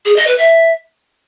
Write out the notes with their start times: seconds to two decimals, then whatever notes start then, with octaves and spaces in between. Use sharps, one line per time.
0.05 G#4
0.16 D#5
0.27 B4
0.38 E5